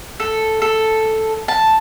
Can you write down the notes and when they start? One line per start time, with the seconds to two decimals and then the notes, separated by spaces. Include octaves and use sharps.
0.20 A4
0.62 A4
1.48 A5